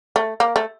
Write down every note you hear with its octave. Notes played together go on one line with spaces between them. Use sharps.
A3
A#3
A3